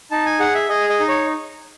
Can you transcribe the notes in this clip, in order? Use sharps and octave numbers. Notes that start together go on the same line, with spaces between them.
D#4 A5
G#5
G#4 F#5
E5
G#4 D#5
D#5
D#4
C#5